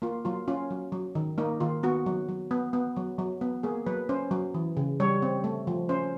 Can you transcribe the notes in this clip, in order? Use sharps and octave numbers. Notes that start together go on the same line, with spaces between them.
A#3 F4
F#3 F4
C#4 F4
F#3
F#3
D#3
A#3 D#4
D#3 F4
B3 F#4
F#3
F#3
B3
B3
F#3
F#3
B3
A#3 G#4
F#3 B4
C#4 C5
F#3
E3
C#3
G3 C#5
C4
A3
F3
C#4 C5